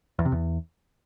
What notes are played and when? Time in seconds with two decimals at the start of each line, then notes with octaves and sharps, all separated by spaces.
0.19 E2
0.25 C3
0.32 E2